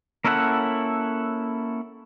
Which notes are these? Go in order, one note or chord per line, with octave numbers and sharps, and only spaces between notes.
A#3 C#4 E4 A4 D5 F#5